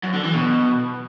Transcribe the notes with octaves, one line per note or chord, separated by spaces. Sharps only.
F#2
D3
E3
B2